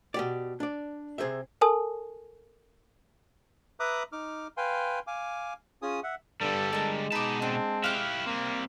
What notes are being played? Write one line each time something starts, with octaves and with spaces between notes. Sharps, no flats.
B2 G4 D5
D4 D5
C3 G#4 C5 E5
A4 A#4 G#5 A5 D#6
B4 E5 A#5 D6 D#6 F#6
D#4 D6 F6
B4 F5 G5 G#5 C6
F5 G#5 D6
C#4 F4 G#4 G#5 D#6
E5 F#5
G2 D3 G3 A4
G#3 A#4 A5
B2 D#4 B4 A5 D6
C4 D4
E4 G4 F5 F#6
G3 A#3 C4